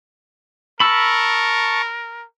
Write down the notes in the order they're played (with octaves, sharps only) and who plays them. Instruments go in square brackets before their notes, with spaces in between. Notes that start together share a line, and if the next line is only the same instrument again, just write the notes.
[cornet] A#4 [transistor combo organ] A5 C#6 [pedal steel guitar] B5 E6